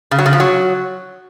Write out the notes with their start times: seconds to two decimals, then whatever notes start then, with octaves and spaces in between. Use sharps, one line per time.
0.11 C#3
0.19 F#3
0.26 C#3
0.33 F3
0.40 F#3